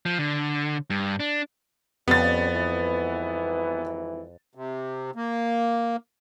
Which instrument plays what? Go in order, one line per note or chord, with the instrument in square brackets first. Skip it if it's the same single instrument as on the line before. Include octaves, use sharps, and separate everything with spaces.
[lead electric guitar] F3
D3
G2
D4
[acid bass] F2 [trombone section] C#3 G3 C#4 [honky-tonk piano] B3 A6
[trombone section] G#1 E3
[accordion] C3
A#3